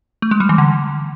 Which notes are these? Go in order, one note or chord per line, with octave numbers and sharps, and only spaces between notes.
A3
G#3
G3
E3
D3